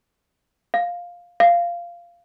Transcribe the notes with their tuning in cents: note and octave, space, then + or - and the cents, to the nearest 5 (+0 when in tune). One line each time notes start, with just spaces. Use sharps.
F5 +10
F5 -10